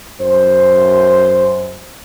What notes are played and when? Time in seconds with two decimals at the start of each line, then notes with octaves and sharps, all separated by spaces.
0.22 F#2 C5